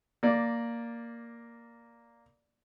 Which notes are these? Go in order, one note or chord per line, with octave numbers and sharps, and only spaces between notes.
A#3 D5